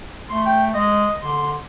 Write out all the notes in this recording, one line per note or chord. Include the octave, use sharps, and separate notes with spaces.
A3 C6
G5
G#3 D#5
D3 C6